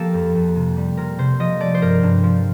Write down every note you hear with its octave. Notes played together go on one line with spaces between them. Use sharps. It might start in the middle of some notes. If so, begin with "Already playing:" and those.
Already playing: F3 A#3 G4 A4
F2
F2
C3
G3
C3 A#4
C3 C5
F3 D#5
A3 D5
C5
G2 A#4
G2
F3